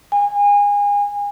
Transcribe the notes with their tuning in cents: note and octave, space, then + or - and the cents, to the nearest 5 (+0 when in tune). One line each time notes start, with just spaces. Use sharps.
G#5 -30